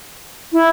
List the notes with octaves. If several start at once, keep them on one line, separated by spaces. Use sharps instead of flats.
E4